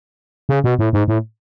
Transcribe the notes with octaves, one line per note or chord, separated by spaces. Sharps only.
C#3
B2
A2
G#2
A2